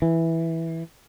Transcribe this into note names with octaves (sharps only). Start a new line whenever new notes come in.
E3